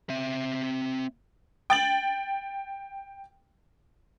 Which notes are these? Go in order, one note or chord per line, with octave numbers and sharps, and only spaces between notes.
C4 E5
G5 A6 F#7